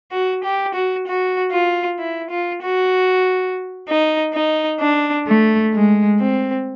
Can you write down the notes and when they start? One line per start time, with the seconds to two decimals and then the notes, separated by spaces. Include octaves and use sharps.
0.11 F#4
0.44 G4
0.74 F#4
1.06 F#4
1.52 F4
1.99 E4
2.30 F4
2.61 F#4
3.87 D#4
4.32 D#4
4.79 D4
5.26 A3
5.73 G#3
6.19 C4